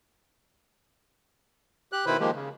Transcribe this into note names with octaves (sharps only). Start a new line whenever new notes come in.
G4 F#6
B2 D#3 E4 B4 C5 B5
D#3 F3 G#3 A#3 G4
C#3